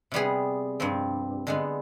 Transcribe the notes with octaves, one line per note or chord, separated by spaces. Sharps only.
C3 G3 B3 G#4
G2 F3 C4
D3 G#3 B3